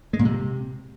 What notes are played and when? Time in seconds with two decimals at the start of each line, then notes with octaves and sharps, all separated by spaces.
0.13 G#3
0.19 A#2
0.25 C3